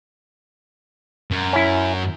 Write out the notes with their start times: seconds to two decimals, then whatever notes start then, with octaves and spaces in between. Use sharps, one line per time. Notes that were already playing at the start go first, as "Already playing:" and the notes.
1.32 F#2
1.53 C#4 E4